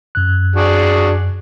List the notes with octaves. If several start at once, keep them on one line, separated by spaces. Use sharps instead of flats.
F#2 F#6
D4 F#4 G#4